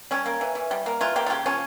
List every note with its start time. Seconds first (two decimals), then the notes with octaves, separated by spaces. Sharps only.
0.11 G3 C#4
0.26 A#3
0.41 E3
0.55 E3
0.71 G3
0.86 A#3
1.01 E3 F4
1.16 A#3 G4
1.26 F4
1.30 C#3 G4
1.46 F3 C#4